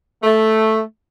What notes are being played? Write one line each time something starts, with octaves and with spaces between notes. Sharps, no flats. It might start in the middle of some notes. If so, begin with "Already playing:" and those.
A3